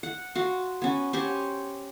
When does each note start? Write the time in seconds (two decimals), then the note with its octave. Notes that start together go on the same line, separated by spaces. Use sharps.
0.03 F#5
0.35 F4 F#4 F5
0.82 B3 C#4
1.13 C#4 G4 C5 C#5